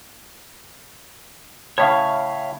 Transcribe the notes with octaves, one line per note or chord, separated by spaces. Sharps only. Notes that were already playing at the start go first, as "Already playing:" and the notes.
A2 C#3 C#5 E5 F5